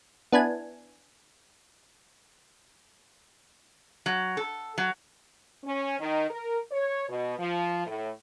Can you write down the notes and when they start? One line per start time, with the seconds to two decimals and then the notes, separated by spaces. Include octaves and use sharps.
0.32 B3 D4 E4 G#5
4.06 F#3
4.37 A4
4.78 F#3
5.64 C#4
6.00 D#3
6.30 A#4
6.72 C#5
7.09 B2
7.39 F3
7.87 A2